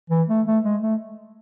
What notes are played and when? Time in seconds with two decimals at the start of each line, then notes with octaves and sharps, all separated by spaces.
0.10 E3
0.29 A3
0.46 A3
0.64 G#3
0.82 A3